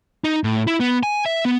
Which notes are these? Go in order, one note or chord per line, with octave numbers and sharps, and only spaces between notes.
D#4
A2
E4
B3
G#5
E5
B3